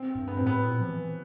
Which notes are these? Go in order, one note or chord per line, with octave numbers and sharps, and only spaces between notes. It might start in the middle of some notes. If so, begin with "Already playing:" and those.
Already playing: C4
G2
B3
A2 C4
B3
A#2
F3
E3